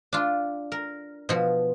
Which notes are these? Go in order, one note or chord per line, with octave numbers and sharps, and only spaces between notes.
D4 F4
A#4
B2 F3